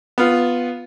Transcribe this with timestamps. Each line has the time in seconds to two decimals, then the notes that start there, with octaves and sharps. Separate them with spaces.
0.18 B3 F4